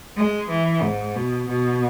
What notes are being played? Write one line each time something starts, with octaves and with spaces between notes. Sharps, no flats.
G#3
E3
G#2
B2
B2